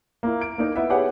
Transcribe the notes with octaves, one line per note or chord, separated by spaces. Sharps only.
A#3 E4
D7
A#3 D#4 A#4
B3 E4 E5
G4 G#4 B4 C#5 F#5 G5